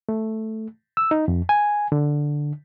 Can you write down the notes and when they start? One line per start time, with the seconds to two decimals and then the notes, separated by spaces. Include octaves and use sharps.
0.09 A3
0.97 E6
1.11 D#4
1.28 F2
1.49 G#5
1.92 D3